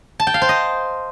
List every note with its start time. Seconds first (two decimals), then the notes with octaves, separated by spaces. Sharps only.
0.20 A5
0.27 G5
0.34 F5
0.42 C5
0.49 D#5